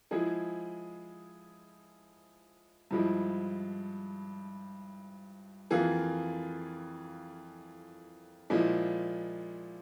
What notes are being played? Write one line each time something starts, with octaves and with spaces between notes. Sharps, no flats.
F3 G#3 E4 G#4
G2 F3 G#3 E4
F2 E3 A#3 F4 G#4
A#2 F3 G#3 E4